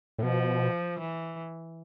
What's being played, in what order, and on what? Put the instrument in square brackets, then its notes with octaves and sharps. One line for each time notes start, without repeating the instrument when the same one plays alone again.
[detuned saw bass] A2
[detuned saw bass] B2 [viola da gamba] F3
[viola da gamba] E3